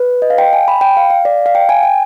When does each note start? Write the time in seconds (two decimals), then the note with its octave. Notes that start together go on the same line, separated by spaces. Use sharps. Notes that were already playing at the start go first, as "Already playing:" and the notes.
Already playing: B4
0.22 D#5
0.30 F5
0.38 G5
0.53 G#5
0.68 B5
0.81 G5
0.97 F5
1.10 F5
1.25 D5
1.46 F5
1.55 G5
1.69 G#5
1.83 G5